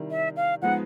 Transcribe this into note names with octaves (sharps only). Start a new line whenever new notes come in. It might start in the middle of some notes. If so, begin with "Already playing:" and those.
Already playing: C3 D#3 G3 E4
E5
F5
F3 G#3 B3 D#4 F#5